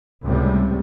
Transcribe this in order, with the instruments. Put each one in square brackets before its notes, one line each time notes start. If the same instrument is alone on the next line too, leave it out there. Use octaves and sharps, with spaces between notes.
[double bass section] C#2 A2 C3 G3